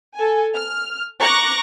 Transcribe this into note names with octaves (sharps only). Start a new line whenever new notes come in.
A4 G#5
F6
A#5 C#6 D6 F#6 A#6